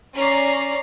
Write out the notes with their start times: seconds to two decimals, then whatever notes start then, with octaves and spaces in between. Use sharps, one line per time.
0.16 C#4 D5 A#5 C7